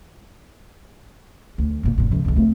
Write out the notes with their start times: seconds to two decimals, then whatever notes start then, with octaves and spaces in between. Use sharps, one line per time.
1.58 D2
1.83 G1 A#2
1.98 G1 A#2
2.10 C#2 F3
2.25 C#2 D3
2.36 A3 C4